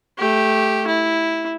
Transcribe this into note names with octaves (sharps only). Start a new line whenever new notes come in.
A3 G4
E4